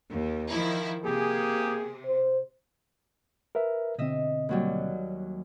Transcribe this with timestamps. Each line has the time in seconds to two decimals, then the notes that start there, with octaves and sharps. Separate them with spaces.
0.10 D#2
0.50 D#3 F3 E4
1.04 C3 A#3 G4 G#4
2.06 C5
3.55 A#4 B4 E5
3.98 B2 D3 C4 D#5 E5
4.49 D#2 F#3 G3